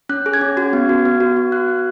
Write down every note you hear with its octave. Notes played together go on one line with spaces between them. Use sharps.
C#4 F#6
G#4
G#6
C#4
F#4 G#6
B3
F#4
B3
F#4
B3
F#4 F#6
B3